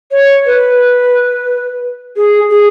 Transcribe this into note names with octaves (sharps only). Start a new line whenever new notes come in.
C#5
B4
G#4
G#4